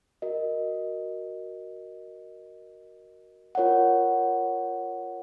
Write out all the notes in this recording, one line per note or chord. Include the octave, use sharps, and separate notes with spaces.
F#4 A#4 D#5
F4 A#4 C#5 F#5